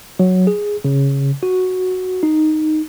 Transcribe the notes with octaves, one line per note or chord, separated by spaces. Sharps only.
F#3
G#4
C#3
F#4
D#4